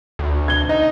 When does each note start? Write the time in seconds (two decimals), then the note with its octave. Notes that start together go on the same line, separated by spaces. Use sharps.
0.19 D2
0.48 G#6 G7
0.69 D#4 D#5